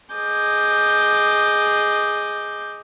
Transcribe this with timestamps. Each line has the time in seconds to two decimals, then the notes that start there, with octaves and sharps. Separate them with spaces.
0.13 G#4 D#5 D6 G6